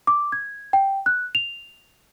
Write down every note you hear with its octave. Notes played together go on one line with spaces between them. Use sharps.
D6
G#6
G5
F#6
F7